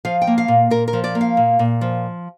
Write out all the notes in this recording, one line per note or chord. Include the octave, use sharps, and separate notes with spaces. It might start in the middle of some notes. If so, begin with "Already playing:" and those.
F3 F5
G5
A#3
F5
A#2
A#2 A#4
A#4
F3
D5
A#3
F5
A#2
A#2
F3